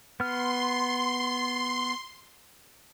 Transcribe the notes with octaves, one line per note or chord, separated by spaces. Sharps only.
B3 C6 F6